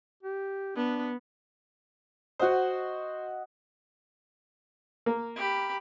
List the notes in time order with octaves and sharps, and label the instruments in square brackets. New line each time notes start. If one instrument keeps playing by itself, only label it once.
[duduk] G4
[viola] B3 [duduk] D4
[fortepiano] F#4 C5 [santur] D#5 F#5
[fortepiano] A#3
[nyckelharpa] G4 B5